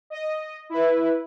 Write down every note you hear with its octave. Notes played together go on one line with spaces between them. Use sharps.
D#5
E4 B4